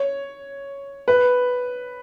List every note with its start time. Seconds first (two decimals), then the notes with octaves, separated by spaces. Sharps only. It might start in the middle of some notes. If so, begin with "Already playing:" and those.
Already playing: C#5
1.08 B4